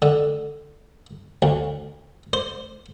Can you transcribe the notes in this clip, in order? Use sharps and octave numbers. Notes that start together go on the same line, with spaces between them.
D3
D2
C5